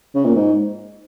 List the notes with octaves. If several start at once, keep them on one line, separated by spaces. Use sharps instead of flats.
C#3
A#2
G#2